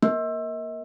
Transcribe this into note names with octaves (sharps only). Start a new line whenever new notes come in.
A#3